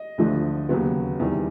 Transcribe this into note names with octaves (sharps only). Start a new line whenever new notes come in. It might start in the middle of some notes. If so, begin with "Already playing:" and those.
Already playing: D#5
D2 D3 F3 A3 D4
D#2 C#3 F#3 B3
E2 C3 D#3 G3